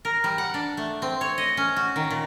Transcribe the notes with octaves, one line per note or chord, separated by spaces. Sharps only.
A#4
G3
F#5
D4
A3
C4
C#5
D#5
C#4
F#4
D#3
A#2